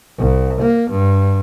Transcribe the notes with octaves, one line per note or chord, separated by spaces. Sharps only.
C2
A#3
G2